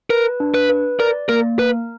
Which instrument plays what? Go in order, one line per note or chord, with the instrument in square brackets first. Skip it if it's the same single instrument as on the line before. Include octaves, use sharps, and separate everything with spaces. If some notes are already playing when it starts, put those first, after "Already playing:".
[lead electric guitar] A#4 [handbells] B4
[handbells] D4
[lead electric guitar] B4
[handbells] B4
[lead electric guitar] A#4 [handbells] D5
[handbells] A#3 [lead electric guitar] A#4
[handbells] A#4 [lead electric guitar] B4